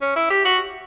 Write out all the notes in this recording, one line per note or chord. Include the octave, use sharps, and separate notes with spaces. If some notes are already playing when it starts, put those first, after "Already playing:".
C#4
E4
G4
F#4